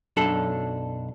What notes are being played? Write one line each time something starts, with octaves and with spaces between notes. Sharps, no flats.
B1 F#2 D4 A4